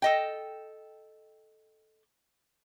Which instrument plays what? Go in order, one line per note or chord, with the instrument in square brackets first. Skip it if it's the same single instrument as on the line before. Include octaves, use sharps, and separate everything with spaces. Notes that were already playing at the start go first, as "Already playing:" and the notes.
[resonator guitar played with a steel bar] A4 D#5 G5